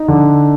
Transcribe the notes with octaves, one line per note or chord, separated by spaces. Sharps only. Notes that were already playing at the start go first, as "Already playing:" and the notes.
Already playing: D#4
D3